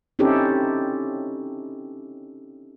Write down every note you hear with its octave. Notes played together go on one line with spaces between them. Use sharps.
C4 C#4 D#4 E4 G4 A4